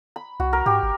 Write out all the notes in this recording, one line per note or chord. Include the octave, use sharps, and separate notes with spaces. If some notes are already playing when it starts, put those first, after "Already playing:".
B5
C2 F#4
A#4
G#2 G4
G#1